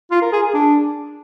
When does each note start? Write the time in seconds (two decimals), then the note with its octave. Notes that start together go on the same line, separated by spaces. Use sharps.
0.11 F4
0.22 A#4
0.32 G#4
0.43 G#4
0.54 D4